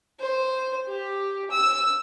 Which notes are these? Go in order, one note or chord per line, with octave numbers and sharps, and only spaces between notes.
C5
G4
E6